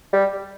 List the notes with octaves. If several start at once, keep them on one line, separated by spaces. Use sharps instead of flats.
G3